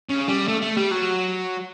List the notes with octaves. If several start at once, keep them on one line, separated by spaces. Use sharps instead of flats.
C#3
G3
A3
A3
G3
F#3